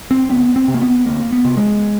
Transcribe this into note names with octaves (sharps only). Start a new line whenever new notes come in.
C4
D2 B3
C4
C3
A#3
B3
D2 A#3
B3
C3
G#3